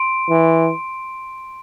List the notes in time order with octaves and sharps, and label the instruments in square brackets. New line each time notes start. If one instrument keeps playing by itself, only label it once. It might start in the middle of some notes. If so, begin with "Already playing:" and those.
Already playing: [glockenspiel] C6 D7
[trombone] E3